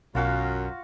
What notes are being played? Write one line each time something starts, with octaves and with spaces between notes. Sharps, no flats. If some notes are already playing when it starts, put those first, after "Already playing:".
B1 F#2 F4 F#4 F5